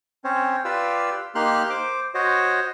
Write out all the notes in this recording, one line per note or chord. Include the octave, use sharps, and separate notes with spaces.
C4 C#4 C5 C#5
F4 G4 B4 D5 F5 E6
A#3 D#4 G4 C6 F6 F#6
C5 D6
F#4 C5 C#5 D#5